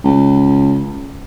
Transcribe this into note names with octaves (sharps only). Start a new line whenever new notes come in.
C#2